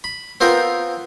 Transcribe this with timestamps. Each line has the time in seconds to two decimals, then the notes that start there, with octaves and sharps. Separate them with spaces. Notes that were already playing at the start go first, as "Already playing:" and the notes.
0.04 B5
0.41 B3 C4 F4 A#4 G5